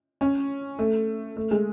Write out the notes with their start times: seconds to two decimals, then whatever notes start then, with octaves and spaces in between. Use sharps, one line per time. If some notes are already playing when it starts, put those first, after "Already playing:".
0.21 C#4
0.79 A3
1.37 A3
1.51 G#3